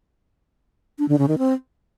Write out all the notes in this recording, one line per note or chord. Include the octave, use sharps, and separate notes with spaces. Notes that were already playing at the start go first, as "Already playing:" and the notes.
D4
D3
C#3
D#3
C4